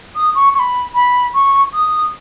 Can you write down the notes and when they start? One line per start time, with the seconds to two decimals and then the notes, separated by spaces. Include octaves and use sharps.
0.16 D#6
0.35 C#6
0.54 C#6
0.59 B5
0.95 B5
1.35 C#6
1.74 D#6